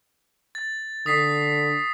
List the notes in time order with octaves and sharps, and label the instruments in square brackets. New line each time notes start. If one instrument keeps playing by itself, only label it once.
[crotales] A6
[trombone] D3 [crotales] D#6 B6 C7